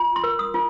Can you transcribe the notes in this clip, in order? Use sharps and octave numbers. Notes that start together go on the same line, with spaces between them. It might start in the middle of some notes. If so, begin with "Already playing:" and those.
Already playing: F4
C6
A#4
D#6
F4